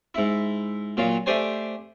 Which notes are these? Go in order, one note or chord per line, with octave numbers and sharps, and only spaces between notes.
G#2 E4
A#2 F#3 F4
A3 D4 G4 C5 G#5